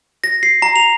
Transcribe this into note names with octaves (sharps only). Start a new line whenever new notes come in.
A#6
C7
A#5
F7